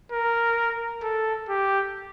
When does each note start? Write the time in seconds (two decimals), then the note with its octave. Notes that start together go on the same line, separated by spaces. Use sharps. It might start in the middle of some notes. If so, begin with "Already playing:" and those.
0.12 A#4
1.03 A4
1.49 G4